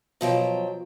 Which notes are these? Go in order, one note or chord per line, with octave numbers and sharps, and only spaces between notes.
B2 F3 F#3 G5